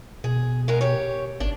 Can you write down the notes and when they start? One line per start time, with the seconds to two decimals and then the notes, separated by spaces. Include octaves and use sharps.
0.24 B2 G#4
0.68 G#3 B3 A#4
0.81 G4 C#5
1.40 G#1 D4